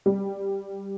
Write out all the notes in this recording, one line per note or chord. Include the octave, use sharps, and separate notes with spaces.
G3